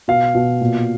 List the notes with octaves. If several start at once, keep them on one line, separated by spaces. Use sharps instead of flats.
B2 F5
B2
A#2